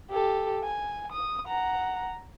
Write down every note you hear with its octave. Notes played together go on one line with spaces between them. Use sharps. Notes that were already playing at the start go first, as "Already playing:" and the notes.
G4 A4
G#5
D#6
F#5 A#5